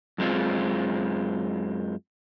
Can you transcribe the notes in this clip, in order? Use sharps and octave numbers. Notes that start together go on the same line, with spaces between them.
F#2 G#3 C4 F4